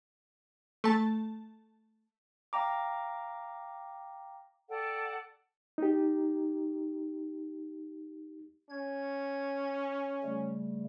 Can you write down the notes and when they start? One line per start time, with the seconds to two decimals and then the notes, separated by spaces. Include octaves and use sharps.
0.84 A3 A5
2.53 F5 G5 A#5 D6
4.69 A4 D5 F#5 G5
5.78 D#4 G4
8.70 C#4 G#6
10.23 C#3 G3 A3